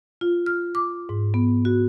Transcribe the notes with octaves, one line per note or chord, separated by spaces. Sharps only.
F4
F6
D6
G#2
B3
F#4